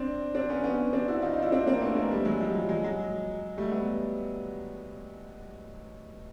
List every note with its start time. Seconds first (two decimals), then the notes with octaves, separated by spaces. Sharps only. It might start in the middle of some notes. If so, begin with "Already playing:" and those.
Already playing: C4 D4
0.34 C4 D4
0.49 B3 C#4
0.64 B3 C#4
0.93 C4 D4
1.08 E4 F#4
1.22 D#4 F4
1.33 D#4 F4
1.42 D4 E4
1.52 C4 D4
1.66 A#3 C4
1.82 A3 B3
1.95 G#3 A#3
2.11 G3 A3
2.25 F#3 G#3
2.40 F3 G3
2.54 F#3
2.69 F#3 G#3
2.84 F#3 G#3
3.57 G3 A3
3.71 A3 B3